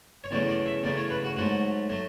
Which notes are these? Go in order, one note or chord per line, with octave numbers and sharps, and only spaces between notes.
C#5
E2 C#3 F#3 A3 D5
D5
E5
E2 C#3 F#3 A3 D5
C#5
B4
F#4
G#2 F#3 A3 F#4
F#3 A3